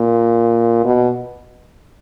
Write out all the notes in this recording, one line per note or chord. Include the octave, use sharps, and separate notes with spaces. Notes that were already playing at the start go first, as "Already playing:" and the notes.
Already playing: A#2
B2